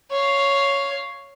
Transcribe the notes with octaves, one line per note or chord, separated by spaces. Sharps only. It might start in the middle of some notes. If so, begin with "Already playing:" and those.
C#5 F5